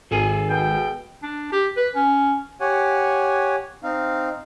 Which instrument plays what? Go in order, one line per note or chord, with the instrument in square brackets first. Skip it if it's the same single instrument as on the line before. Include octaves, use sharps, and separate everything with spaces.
[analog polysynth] G#1 [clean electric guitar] G#4 A4 G#5
[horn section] B2 G5
[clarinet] D4
G4
B4
C#4
[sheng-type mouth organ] G4 C#5 F#5 G#5
C4 D#4 F5